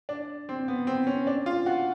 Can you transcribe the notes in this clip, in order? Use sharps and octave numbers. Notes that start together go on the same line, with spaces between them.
D4
C4
B3
C4
C#4
D4
F4
F#4